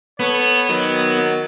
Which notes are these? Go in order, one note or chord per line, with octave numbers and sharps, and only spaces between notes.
B3 A4 B4 C#5
D#3 F#3